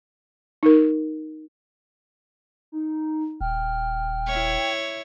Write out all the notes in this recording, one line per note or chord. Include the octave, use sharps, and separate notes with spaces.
D#4 A#4
D#4
D#1 G5 F6
E4 C#5